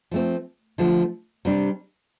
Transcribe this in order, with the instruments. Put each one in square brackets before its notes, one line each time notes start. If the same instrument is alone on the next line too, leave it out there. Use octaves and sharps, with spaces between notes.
[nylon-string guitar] F3 A3 C4
D3 F3 A3
C3 G3 D4